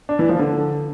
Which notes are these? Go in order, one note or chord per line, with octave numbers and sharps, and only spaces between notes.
D4
E3
F3
D3